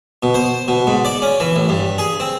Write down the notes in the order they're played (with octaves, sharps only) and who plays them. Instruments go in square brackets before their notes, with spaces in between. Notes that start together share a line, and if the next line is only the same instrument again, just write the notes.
[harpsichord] B2
C5
B2
G#2
D5
C#4
E3
A1
G2
G#4
C4